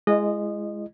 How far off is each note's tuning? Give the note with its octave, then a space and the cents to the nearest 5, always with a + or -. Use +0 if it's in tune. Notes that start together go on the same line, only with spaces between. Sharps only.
G#3 +0 E4 +40 D#5 -20